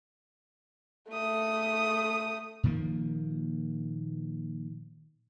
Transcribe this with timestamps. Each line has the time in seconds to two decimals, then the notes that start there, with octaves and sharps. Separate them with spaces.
1.10 A3 D#6
2.63 A#2 D#3 F3 A#3